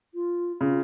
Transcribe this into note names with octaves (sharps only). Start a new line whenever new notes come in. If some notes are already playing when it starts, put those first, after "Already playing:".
F4
C#3 F4